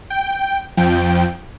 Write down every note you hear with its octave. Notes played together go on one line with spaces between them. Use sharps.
G5
F2 F3 G5